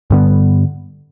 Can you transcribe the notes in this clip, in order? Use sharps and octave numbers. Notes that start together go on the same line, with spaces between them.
G2 D3 G3 B3